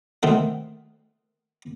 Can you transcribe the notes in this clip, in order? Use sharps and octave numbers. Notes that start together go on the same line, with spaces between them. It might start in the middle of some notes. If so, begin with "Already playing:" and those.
D#3 A3 C4 F#5